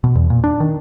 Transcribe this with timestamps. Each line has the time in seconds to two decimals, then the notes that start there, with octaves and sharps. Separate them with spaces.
0.04 B2
0.15 E2
0.30 A#2
0.44 D4
0.60 D#3